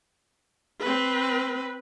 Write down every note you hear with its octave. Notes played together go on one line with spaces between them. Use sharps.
C4 B4